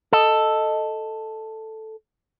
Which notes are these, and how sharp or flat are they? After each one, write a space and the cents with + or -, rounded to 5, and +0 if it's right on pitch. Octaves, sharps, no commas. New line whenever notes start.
A4 +0 D#5 +0